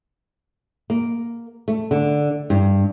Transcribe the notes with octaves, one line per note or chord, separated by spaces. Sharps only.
A#3
A3
D3
G2